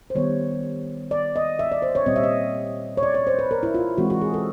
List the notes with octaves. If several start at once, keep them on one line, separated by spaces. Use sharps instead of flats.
C5
D#3 G3 B3 C#5
D5
D#5
E5
D5
C5
C#5
A#2 G3 C4 D#5
E5
D#5
C#5
D5
C#5
C5
B4
A#4
E4
F4
E3 G#3 C4 F#4
F#4
G#4
A4